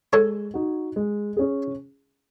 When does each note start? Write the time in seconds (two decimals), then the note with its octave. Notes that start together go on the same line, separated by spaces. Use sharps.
0.13 G#3 A4 C#5
0.54 D#4 F#4
0.96 G#3
1.37 C#4 G#4